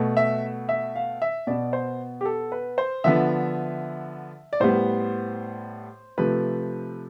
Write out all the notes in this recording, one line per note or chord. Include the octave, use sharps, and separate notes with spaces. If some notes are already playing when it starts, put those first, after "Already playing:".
Already playing: B2 A3
E5
E5
F5
E5
B2 B3 D5
C5
G4
A4
B4
C5
D3 F3 B3 E5
D5
A2 G3 B3 C5
C3 F3 A3 B4